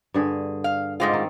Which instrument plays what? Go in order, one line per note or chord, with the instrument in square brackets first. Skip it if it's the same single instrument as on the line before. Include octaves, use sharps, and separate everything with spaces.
[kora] G2 D3 G#4
[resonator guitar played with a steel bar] F5
[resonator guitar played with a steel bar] G#2 G#3 F4 [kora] C4 D5
[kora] D#3